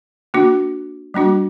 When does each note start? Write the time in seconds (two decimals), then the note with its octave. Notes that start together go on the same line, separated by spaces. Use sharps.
0.34 A#3 D4 F#4
1.14 G3 A#3 D4 F#4